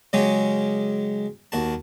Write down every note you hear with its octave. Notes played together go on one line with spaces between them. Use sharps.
C#3 F#3 G#3 C#4 G4 C#5
D#2 F#4 A5